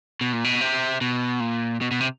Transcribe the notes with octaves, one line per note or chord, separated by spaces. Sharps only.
B2
A#2
B2
C3
B2
A#2
B2
B2
C3